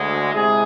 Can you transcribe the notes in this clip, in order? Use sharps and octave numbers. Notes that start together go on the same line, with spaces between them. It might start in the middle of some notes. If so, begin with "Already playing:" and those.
Already playing: D2 D3 G#3
C3 G#3 E4 G#4